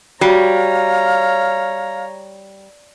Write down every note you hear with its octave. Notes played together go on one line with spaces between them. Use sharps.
G3 F#4 C#5 F5 A#5